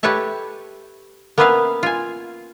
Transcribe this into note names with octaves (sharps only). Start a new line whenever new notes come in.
G4 A4 B4 C#5 E5 A5
A#3 B3 C#4 B4 E5 F5
F4 G#5